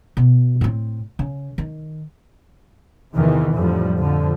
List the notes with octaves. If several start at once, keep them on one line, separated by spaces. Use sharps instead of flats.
B2
A2 C4
C#3
D#3
E2 C3 D#3 E3
F2 A2 D3 F3 G3
F2 D3 F3